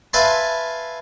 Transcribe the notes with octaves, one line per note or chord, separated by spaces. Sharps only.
B4 E5 F5 G#5 A5 C6